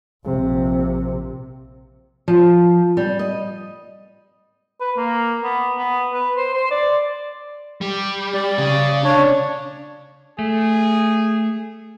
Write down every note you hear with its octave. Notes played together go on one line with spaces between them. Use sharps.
A#1 C3
F3
G3
D#5
B4
A#3
B3
B3
B4
C5
C5
D5
G3
D5
C#3
D4 C#5
A3 G#4